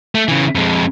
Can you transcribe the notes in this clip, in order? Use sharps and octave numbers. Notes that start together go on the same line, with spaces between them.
A3
C#3 E3
F2 G#3